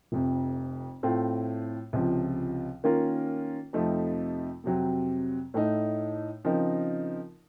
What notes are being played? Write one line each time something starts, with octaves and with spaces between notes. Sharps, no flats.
F1 F2 C3
A2 A3 C4 F4
C#2 C3 F3
D#3 A#3 C#4 F4 A#4
F2 C3 F3 A3 D#4
F2 C3 F#3 C4
A2 A3 D#4
C#3 F3 C4 D#4 A#4